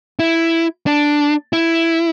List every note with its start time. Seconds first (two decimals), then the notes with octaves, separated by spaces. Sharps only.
0.19 E4
0.87 D4
1.53 E4